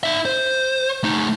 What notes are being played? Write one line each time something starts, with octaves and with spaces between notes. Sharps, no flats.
D#4 E5
C5
A3 D#4